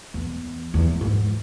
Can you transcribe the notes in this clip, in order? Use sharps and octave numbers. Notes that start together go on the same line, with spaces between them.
E2
E2
G#2